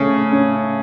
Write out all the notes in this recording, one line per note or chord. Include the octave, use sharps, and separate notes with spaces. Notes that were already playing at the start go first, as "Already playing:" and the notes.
Already playing: C#3 A3 C#4
C#4